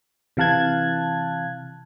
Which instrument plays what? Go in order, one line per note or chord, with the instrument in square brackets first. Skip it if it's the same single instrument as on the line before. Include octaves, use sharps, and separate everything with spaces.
[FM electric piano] C3 E3 F5 A5 F#6 G#6